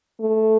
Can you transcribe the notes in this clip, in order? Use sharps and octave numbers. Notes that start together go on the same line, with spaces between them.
A3